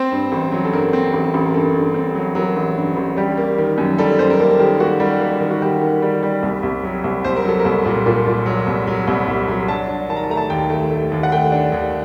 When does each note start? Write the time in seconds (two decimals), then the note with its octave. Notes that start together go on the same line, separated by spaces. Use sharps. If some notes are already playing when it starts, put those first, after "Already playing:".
Already playing: C4 C5
0.12 G2
0.32 A1
0.52 F#3
0.65 A4
0.73 G2 A#4
0.93 C4
1.13 A1
1.34 A1
1.46 A#4
1.54 G2 A4
1.74 G2
1.94 C4
2.15 F#3
2.35 F#3 A#4
2.56 A1
2.76 G2
2.97 A1
3.17 G3 G4
3.38 A#3
3.58 D#3
3.78 F#2
3.98 G3 A4
4.19 F#2 C5
4.30 A#4
4.39 A#3 A4
4.50 A4
4.59 D#3 G4
4.80 A#3 F#4
5.00 G3
5.20 A#3
5.41 D#3
5.51 F#4
5.62 G3 G4
5.82 D#3
6.02 G3
6.23 G3
6.43 C2
6.63 C2
6.83 F#3
7.04 C2
7.24 C2 C5
7.36 A#4
7.44 F#3 A4
7.60 A#4
7.65 C2
7.85 A#2
8.06 A#2
8.27 A#2
8.46 F#3
8.67 C2
8.87 F#3
9.07 C2
9.27 C2
9.48 F#3
9.68 D4 A5
9.89 D4
10.09 D#3 A5
10.17 A#5
10.24 A5
10.30 A3 A#5
10.37 A5
10.50 D#2 G5
10.70 A3
10.91 A3
11.12 D#2
11.23 F#5
11.32 A3 G5
11.52 D4
11.72 D#2